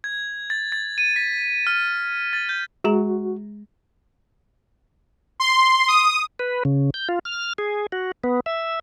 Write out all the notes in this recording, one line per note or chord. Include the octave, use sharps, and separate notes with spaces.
G#6
A6
A6
D#7
B6
F6
A6
G6
G#3 F#4 G#4 A#5
C6
D#6
B4
C#3
G6
F4
F6
G#4
F#4
B3
E5